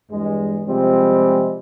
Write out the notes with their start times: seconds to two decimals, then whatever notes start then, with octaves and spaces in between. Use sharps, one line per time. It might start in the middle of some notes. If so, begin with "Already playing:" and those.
0.10 E2 G2 G#3
0.67 C3 F3 G3 G#3 C4